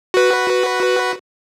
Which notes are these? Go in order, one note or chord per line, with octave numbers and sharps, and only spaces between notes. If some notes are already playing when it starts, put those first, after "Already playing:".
F#4 B4